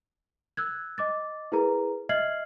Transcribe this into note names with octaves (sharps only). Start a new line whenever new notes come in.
E6 F#6 G#6
D#5 D6 A6
E4 G#4 A#4 B4 A#5
D#5 E5 F6 G#6 C7 F#7